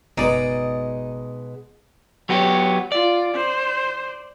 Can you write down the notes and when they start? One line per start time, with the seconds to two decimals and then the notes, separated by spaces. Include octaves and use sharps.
0.17 F#1 B2 G#3 D#4 B4 D5
2.29 F#3 B3 G4 C#5
2.92 F4 D5
3.34 C5